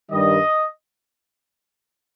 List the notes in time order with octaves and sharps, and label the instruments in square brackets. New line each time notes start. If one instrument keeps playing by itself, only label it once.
[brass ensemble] G2 D#3 G3 D#5